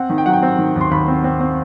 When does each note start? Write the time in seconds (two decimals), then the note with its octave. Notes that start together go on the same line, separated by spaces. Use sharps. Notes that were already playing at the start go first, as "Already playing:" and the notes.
Already playing: C4 F#5
0.10 D#3
0.18 G5
0.26 F#3 F#5
0.33 G5
0.43 C4
0.59 D#3
0.76 D#2
0.81 C6
0.91 D#2 B5
1.08 C4
1.24 C4
1.40 C4